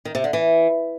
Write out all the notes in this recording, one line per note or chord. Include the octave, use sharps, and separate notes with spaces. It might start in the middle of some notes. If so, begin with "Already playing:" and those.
D#3
C3
D3
E3